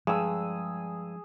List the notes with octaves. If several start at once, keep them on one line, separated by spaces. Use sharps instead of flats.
G2 F3 G#3 G#4 E6